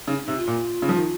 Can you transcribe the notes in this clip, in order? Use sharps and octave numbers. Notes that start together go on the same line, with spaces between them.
C#3 D#4
C#4
C3 D#4
F4
A#2
C#3
F3
D#3